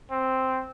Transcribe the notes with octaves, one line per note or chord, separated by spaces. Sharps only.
C4